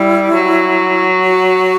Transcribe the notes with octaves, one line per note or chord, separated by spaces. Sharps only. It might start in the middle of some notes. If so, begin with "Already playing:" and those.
Already playing: G3 E4
F#3
F#4